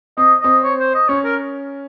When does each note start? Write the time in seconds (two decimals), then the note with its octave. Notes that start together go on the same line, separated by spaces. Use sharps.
0.17 C4 D#5
0.41 C4 D#5
0.63 C#5
0.79 C5
0.94 D#5
1.09 C#4 C#5
1.24 A#4